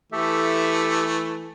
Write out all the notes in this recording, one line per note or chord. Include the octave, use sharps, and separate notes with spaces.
E3 A3 G4 A4 E5